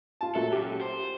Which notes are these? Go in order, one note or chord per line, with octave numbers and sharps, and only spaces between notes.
F4 A5
A#2 F#3 A4 E5
F#2 G4
C5